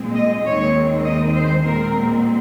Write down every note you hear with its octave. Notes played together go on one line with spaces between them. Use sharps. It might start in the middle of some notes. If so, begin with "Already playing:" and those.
Already playing: A#2 G#3 C4
D#5
D#2 D#3 G#3 C4 C#5
D#5
C5
A#2 G#3 C4 A#4